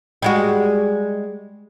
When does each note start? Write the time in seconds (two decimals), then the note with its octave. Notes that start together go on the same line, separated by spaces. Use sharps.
0.22 G3 G#3 F#4